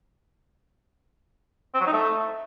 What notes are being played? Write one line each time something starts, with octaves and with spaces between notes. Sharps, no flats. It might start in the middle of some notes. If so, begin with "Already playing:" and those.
C4
F#3
D#4
A3